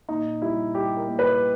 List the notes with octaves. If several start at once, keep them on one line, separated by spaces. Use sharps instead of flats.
A#2 D#4
G3 E4
G3 G4
A#4
A#2
B4